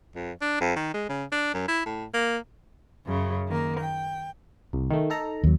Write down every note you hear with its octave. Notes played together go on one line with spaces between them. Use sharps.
F2
D4
F2
D#3
G#3
C#3
D4
F#2
E4
A2
A#3
F#2 C#3 F#3
D#3 A#3
G5
C2
D#3 A3
D#4 A4 A#5
D#2 F#3